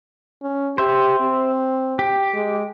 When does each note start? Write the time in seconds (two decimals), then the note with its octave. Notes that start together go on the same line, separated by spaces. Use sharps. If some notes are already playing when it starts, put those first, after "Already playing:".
0.42 C#4
0.78 G4 C5 E5
1.20 C4
1.99 G4
2.34 G#3